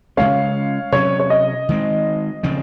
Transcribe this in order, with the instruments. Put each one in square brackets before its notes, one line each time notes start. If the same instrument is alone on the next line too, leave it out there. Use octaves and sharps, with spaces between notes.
[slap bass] C#3 G#3 C#4 [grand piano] C#5 F5
[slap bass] C3 F#3 C#4 [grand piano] C#5
[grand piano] C#5
D#5
[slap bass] D#3 G#3 C4
C#3 F3 C4